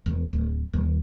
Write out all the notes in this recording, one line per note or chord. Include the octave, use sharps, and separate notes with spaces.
E1
D1
D#1